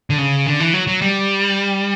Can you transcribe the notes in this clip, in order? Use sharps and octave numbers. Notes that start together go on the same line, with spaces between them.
D3
C#3
D3
E3
F#3
F#3
G3